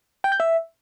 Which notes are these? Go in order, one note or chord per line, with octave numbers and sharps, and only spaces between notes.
G5
G6
E5